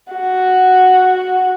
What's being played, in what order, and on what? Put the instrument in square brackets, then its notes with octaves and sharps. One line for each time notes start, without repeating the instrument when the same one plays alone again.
[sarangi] F#4